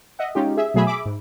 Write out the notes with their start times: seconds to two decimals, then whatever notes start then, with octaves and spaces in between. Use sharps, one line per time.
0.19 D#5 E5 F#5
0.35 G#3 C#4 D#4 F4 G4
0.57 G#4 E5
0.74 B2 F#3 A3 G#4 E5 B5
0.87 G#4 E5 B5 D6
1.05 G#2